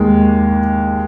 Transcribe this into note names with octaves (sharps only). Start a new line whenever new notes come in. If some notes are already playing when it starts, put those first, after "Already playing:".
Already playing: D#2 D#3 G#3 A#3